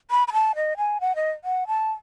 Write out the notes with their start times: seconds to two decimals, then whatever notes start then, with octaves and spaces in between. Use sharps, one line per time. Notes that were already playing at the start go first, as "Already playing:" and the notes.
0.11 B5
0.28 B5
0.33 A5
0.55 D#5
0.77 G#5
1.01 F#5
1.16 D#5
1.44 F#5
1.67 A5